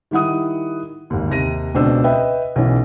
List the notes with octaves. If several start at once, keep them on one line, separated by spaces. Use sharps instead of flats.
D#3 G3 E4 F#5 D#6
G#1 D#2
D#2 C3 A#6 D#7
C#2 B2 C4 D4 C5 E6
B4 D#5 E5 G5
B1 E3 C#4